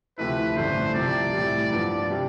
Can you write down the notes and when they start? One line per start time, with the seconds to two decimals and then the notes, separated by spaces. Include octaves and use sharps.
0.18 D2 C3 F3 A3 E4 B4
0.57 A1 G2 D3 A3 D4 C5
0.94 C2 C3 F3 D5
1.33 A2 E3 G3
1.71 G2 F3 B3 D4
2.11 C3 G3